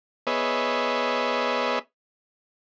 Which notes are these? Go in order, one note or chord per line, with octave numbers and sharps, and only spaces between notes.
B3 G#4 B4 C#5 D#5 E5